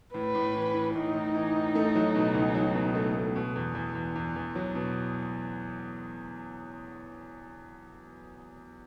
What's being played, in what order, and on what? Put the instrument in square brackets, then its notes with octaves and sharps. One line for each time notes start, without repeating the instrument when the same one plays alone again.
[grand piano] A2 [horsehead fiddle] B4
[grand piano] A2
E3
E3
[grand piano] A2 [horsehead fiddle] D#4
[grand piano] A2
E3
A2
A3
F#3
B2
C#2
F#3
B2
A3
A3
B2
E2
E2
E2
E2
E2
F#3
B2